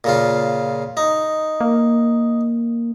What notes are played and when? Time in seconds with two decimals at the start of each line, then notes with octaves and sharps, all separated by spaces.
0.04 A#2 C#3 F4
0.97 D#4
1.61 A#3